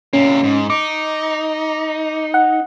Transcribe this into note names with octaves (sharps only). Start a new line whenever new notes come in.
C3 A#3 C#4
G#2
D#4 D6
F#5